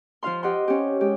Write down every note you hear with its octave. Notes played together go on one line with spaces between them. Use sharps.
F3 F4 F5 C6
G4 D#5 F#5 C6
C#4 G4
G#3 G4